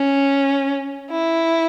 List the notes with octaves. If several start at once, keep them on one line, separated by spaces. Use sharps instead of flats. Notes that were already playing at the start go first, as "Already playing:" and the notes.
Already playing: C#4
E4